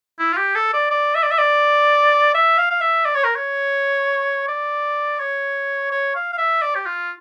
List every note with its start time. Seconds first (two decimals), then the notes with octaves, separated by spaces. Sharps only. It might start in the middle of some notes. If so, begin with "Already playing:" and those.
0.19 E4
0.32 F4
0.37 G4
0.55 A4
0.73 D5
0.90 D5
1.15 E5
1.23 D5
1.31 E5
1.38 D5
2.34 E5
2.57 F5
2.70 F5
2.80 E5
3.05 D5
3.14 C#5
3.24 A#4
3.35 C#5
4.48 D5
5.19 C#5
5.91 C#5
6.15 F5
6.32 F5
6.38 E5
6.61 D5
6.75 G4
6.86 F4